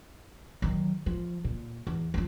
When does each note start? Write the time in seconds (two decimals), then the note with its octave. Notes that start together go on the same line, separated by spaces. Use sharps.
0.62 D#3 F#3
1.06 F3
1.44 A#2
1.87 E2
2.14 F3 F#3